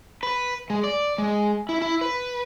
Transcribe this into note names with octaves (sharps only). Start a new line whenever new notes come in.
B4
G#3
D5
G#3
E4
E4
B4